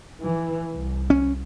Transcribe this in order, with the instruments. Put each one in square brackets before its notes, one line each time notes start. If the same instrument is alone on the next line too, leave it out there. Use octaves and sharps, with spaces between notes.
[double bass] E3
C2
[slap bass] C#4